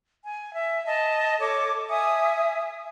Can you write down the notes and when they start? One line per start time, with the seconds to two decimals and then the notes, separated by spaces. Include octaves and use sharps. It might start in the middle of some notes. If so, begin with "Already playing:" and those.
0.25 G#5
0.54 E5
0.87 D#5 A5
1.40 A4 C#5 D6
1.89 E5 G#5 D#6